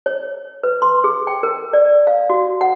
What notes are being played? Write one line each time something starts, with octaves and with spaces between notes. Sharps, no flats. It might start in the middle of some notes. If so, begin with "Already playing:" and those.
C#5
B4
C6
G#4
G5
A#4
D5
F5
F#4
F#5